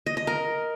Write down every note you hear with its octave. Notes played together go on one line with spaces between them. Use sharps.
D#5
D#5
A#4